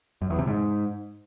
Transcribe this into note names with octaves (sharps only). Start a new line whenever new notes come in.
F#2
E2
C3
G#2